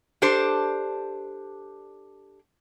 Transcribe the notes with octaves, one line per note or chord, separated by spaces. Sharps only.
D4 G4 A4 C5